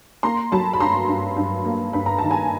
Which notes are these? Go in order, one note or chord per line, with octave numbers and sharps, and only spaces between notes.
A#3 A#5 C6
F#3 A5 B5
B5
G2 A#5 C6
G2
G2
A#3
G2 B5
A#5
D#3 A5
G#5 A#5